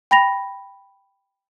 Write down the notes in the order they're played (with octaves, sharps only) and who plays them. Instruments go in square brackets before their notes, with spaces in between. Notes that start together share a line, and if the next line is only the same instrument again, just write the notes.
[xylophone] G5 B5 A#6 F7